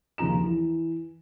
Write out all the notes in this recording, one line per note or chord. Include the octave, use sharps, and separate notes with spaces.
D#2 C#3 F3 A#5 E7
E3